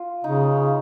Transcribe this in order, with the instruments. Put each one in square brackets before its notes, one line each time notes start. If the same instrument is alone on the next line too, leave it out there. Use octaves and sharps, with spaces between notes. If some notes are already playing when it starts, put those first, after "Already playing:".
Already playing: [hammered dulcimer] F4
[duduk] C#3 [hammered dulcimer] D#4